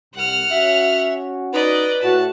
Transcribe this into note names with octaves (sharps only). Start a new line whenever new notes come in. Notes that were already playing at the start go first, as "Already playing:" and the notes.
C2 F#5 F6
C#4 F#4 E5
D#4 B4 D5 D#5
A2 F#4 A5